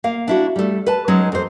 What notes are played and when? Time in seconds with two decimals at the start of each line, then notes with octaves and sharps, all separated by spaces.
0.04 A#3 F5
0.28 D4 E4 F#4
0.56 G3 A3
0.86 B4 A5
1.08 F#3 G#3 C#4 D#4
1.32 F2 C5